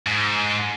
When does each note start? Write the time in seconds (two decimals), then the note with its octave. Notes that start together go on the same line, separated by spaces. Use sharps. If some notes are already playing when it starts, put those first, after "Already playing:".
0.06 G#2